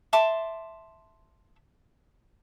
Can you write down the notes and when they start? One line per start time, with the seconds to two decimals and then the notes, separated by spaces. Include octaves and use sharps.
0.13 E5 A5 C6 D6